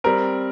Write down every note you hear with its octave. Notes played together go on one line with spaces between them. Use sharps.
G3 C4 A#4